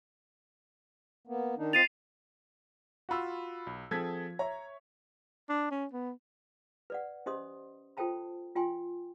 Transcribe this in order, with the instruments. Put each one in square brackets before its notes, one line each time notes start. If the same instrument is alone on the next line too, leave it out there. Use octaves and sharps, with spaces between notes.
[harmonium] A#3 B3
D#3 D4 D#4
[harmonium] C4 F4 D#5 [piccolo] A6 [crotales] C7 D#7 F7
[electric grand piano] F4 F#4 [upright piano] F#5 B5 E6
[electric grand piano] B1
[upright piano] F3 G#6 B6 [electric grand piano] C4 G#4 A4
[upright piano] C#5 E5 [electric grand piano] A#5
[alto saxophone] D4
C#4
B3
[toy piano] B4 D5 F#5
C#4 G4 C5 D#5 C6 D#6
F4 A4 C5 G5 A5 B5
F4 G5 G#5 C6